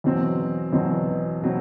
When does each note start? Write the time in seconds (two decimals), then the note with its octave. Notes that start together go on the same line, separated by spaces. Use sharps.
0.04 E2 B2 F#3 C4
0.72 E2 B2 F#3 C4
1.42 B2 F#3 C4